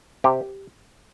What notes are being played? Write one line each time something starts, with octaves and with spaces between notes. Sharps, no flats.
C3 G4